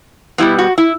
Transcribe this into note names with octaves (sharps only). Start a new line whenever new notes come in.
B2 G3 B3 E4
F#4
E4